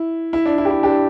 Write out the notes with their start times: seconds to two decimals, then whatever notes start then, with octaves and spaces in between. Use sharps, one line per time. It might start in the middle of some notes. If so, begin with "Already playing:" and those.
Already playing: E4
0.33 E4
0.46 D4
0.58 E4
0.65 G4
0.70 E4
0.83 D4 G4